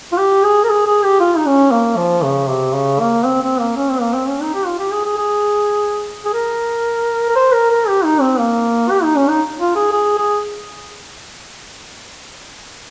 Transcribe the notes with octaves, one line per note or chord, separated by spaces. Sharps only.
F4
G4
G#4
A#4
G#4
G#4
G4
F4
D#4
C#4
A#3
F3
C#3
C3
C#3
A#3
C4
C4
A#3
C#4
C4
A#3
C4
C#4
D#4
G4
F4
G4
G#4
G#4
G#4
G#4
A#4
A#4
C5
A#4
A#4
G4
D#4
C4
A#3
G4
D#4
C#4
D#4
F4
G#4
G#4
G#4